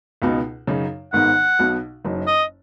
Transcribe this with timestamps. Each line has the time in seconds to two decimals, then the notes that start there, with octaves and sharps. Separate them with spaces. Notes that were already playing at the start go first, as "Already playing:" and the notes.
0.22 C#2 B2 B3 D#4
0.67 F#2 C#3 F#3 D#4
1.13 G#1 G#2 D#3 B3 F#5
1.59 B1 B2 B3
2.05 F#1 F#2 F#3 D#4
2.27 D#5